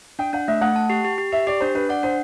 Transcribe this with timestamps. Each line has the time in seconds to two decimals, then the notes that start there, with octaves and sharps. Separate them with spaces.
0.19 D4 G5
0.33 D4 F#5
0.48 A3 E5
0.61 A3 F#5
0.76 A5
0.90 G4
1.05 G4
1.18 G4
1.33 G4 E5
1.47 G4 D5
1.61 D4 C5
1.75 D4 B4
1.89 D5 F#5
2.03 D4 C5